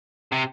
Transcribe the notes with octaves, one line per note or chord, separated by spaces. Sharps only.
C3